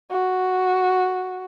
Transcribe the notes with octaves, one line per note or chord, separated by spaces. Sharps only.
F#4